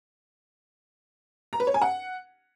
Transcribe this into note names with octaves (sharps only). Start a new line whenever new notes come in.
A#5
B4
C#5
G#5
F#5